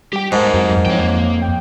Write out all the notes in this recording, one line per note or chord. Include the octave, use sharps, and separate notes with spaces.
G3 G4 G5
G#2 A3 A#4 A5
F2 F#3
F2 F3 C#5 G5
A#3
G5